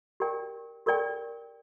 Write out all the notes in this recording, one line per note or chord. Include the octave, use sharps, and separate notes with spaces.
G4 A#4 D5 G5
G4 A#4 D5 G5